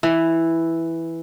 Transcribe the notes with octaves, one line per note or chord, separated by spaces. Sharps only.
E3